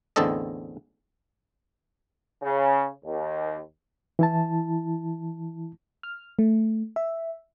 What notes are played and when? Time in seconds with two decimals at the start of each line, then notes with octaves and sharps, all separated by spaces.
0.16 A1 E2 D3 C4 A4 D#5
2.43 C#3
3.05 D#2
4.19 E3 E4 A5
6.03 F6
6.39 A3
6.96 E5